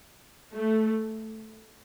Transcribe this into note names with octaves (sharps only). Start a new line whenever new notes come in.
A3